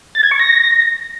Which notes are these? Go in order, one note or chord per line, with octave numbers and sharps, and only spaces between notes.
A6
G#6
C#6
A#6